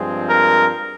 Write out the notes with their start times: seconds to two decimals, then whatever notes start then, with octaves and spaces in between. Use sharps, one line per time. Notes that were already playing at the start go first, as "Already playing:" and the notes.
Already playing: G2 F3 G#3 C4
0.29 A#4